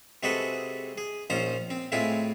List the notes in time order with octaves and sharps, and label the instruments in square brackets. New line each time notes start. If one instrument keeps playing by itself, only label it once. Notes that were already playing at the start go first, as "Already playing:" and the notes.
[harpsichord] C3 G#3 F#4 G#4 A4 B4
G#4
A#1 C#4 D#4 F4 C5 A#5
C4
A2 G#3 C4 E4 F4 G#5